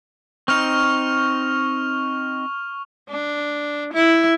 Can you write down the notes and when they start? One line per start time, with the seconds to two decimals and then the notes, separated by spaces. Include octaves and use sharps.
0.48 C4 D#4 C#6 F6 F7
3.10 D4
3.94 E4